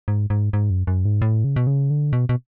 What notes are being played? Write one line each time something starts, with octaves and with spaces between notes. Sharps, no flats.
G#2
G#2
G#2
F#2
F#2
G#2
A2
C#3
B2
C#3
D3
B2
B2